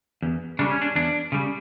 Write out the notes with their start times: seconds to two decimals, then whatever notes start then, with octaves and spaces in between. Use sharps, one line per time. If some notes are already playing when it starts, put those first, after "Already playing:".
0.22 E2
0.59 C#3 G3 D4
0.70 C#4
0.82 D4
0.95 E2 D4
1.32 C#3 G3